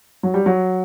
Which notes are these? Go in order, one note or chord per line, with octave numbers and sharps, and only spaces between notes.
F#3
G3
F#3